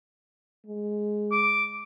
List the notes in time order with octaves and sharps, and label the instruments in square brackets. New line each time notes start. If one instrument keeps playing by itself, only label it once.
[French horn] G#3
[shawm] D6